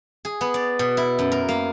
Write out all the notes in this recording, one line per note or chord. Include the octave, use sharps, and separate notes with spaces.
G#4
B3
D5
B2
E4
F#2
A#4
A#3